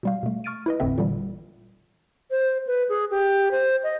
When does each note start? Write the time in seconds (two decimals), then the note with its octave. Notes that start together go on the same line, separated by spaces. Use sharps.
0.03 B2 G3 F5
0.23 B2 A3
0.44 C#6 F6 A6 D7 D#7
0.66 E4 B4 D#5
0.80 G1 E2 A2 D3 C4 E5
0.98 A#2 D3 E3 G3
2.31 C5
2.67 B4
2.89 G#4
3.11 G4
3.51 C5
3.83 D#5